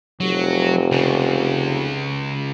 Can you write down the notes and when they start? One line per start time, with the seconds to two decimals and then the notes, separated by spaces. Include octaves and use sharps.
0.20 F1 F#3
0.92 C#2 C#3